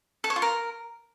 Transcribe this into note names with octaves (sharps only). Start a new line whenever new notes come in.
A4
C#5
F4
A#4